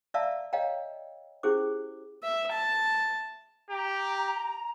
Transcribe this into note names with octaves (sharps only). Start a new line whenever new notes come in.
D5 E5 F5 A5 A#5 E6
C#5 D#5 F5 G5 A#5
C#4 E4 G4 G#4 C5 D6
E5
A5
G4 A#5